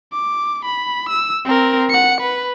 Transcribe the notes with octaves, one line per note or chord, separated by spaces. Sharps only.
D6
B5
E6
C4 A#4
F#5 C#7
B4